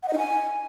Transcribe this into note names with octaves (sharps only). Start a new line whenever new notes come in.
F#5
D#5
D#4
G#5